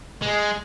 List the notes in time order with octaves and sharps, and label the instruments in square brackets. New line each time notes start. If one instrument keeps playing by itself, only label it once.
[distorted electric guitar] G#3